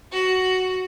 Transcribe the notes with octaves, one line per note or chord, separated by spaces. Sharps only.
F#4